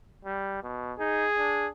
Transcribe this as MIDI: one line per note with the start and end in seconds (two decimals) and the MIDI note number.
0.25 0.59 55
0.63 0.93 47
0.99 1.26 63
0.99 1.68 68
1.38 1.69 62